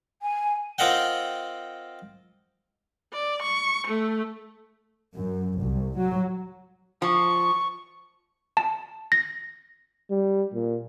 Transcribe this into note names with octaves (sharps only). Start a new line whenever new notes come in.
G#5
C4 F4 A#4 D#5 F#5 G5
D5
C#6
A3
F#2
C2
F#3
F3 C#6
A5
A#6
G3
A#2